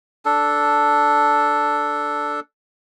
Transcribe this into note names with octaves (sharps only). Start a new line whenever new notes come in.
D4 A4